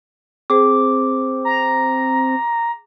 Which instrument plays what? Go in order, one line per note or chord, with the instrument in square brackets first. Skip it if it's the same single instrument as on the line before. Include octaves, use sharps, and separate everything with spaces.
[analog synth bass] C4 [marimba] G#4 C5 [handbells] D6
[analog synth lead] A#5